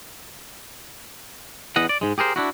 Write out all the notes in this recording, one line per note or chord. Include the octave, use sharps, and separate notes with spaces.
E2 E3 D#5 F#5
D5
G#2 G#3
G4 G#4 A#4 C5
D4 E4 F#4